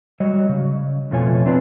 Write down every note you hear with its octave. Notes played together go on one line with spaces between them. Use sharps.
F#3 G3 C#5 D#5
C#3
F2 B2 A3 F4 C#5 G#5
C4 D4 F4 B4